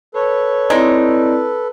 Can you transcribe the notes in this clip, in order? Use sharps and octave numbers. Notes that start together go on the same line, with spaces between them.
A4 B4 C#5
G#3 C4 D#4 E4 D5